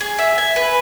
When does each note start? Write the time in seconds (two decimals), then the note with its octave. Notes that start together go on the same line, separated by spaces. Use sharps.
0.01 G#4
0.19 E5
0.38 G#5
0.56 B4